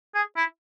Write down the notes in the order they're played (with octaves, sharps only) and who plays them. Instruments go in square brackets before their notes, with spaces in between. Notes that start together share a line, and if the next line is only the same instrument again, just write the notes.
[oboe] G#4
E4